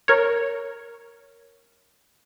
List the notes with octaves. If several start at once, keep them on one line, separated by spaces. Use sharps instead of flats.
A#4 C#5